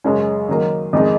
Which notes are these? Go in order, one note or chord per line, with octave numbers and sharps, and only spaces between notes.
F#2 C#3 G#3 C#4
D#3 F#3 A#3
F2 D#3 G#3 D#4